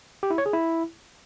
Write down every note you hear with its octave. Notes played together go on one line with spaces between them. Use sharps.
G4
E4
C#5
G#4
E4